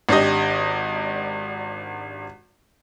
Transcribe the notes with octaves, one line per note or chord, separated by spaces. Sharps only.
G#1 D4 G4 D#5